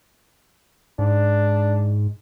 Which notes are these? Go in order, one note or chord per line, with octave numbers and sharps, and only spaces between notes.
G#2 D4